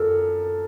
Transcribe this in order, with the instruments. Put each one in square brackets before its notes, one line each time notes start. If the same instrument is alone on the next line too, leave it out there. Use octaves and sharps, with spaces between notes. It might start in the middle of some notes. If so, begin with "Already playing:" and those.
Already playing: [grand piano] F#2 F3 A4 A#4